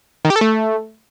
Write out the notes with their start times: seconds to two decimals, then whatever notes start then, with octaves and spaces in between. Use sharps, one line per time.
0.25 D#3
0.30 G4
0.36 A4
0.41 A3